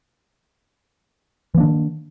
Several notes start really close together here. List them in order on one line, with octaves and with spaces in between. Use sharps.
E3 A#3 D4 D#3